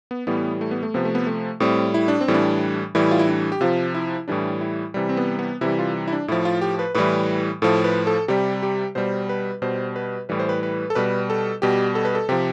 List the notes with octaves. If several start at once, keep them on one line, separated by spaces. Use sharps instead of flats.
B3
A2 E3 G3 B3
A3
B3
A3
C3 F3 B3
A3
B3
A3
A2 G3 C4
E4
D4
C4
A2 E3 G3
D4
A2 E3 G3 E4
F4
E4
D4
G4
C3 F3 F4
E4
A2 E3 G3 D4
E4
C3 E3 G3
C4
B3
B3
C3 E3 G3 E4
F4
E4
D4
A2 F3 E4
F4
G4
B4
A2 E3 G3 B4
A2 F3 A4
B4
A4
C3 G3 G4
G4
B2 G3 C5
B4
B2 G3 C5
B4
A2 E3 G3 B4
C5
B4
B4
A4
B2 G3 B4
A4
B2 G3 G4
A4
B4
A4
C3 F3 G4